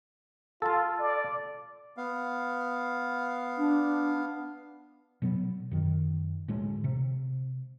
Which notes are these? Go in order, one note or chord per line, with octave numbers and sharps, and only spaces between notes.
F4 A4 A5
D5
B3 F5
D4
B2 F#3 B3
F#2 D#3
D2 A2 G#3
C3